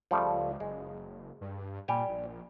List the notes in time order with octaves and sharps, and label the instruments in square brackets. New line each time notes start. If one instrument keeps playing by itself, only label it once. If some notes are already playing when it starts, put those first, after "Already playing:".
[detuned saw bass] C#2 [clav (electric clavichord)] F3 G3 A3
[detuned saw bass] F#1 [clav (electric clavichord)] G#3
[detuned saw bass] G2
[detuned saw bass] A#2 [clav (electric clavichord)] G3 G4 G#5
[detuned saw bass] A#1